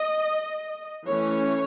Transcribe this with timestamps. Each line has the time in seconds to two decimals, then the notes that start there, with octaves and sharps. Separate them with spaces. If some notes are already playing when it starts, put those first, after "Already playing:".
Already playing: D#5
1.08 E3 A3 C#4 C#5